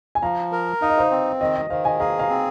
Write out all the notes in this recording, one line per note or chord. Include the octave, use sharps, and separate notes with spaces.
G#5
F3 F5 A#5
A#4
D#4 F5
D#5
C5 F5
C4
D#3 D#5
D#5
D#3 C5 F5
D#5 G#5
G#4 F5 A#5
F5 A#5
C4